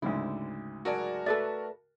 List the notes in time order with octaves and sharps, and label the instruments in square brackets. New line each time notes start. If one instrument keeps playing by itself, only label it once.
[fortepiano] D2 G#2 C#3 [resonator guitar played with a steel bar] E4
[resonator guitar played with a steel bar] F#3 G#4 D5 [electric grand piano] F#4 A#4 A5
[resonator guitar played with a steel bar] A3 E5 [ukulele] A4 B4 D5